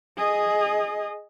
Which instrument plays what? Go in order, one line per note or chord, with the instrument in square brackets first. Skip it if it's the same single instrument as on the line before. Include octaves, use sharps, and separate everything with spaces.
[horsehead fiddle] G#4 D#5